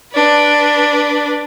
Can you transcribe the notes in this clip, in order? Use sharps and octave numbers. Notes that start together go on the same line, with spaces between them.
D4 B4